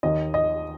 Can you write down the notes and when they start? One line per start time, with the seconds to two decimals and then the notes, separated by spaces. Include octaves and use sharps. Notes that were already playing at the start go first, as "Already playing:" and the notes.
0.03 D#2 D#3 D#5
0.34 D#5